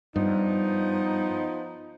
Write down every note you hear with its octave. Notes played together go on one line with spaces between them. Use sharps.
G2 F3 B3 D#4